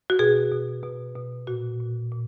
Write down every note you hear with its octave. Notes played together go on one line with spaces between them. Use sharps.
F#4
B2 G#4
B2
B2
B2
A#2 F#4
A#2
A#2